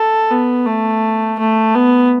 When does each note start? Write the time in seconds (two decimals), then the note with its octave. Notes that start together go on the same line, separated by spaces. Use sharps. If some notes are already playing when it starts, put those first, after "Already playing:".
Already playing: A4
0.31 B3
0.66 A3
1.39 A3
1.75 B3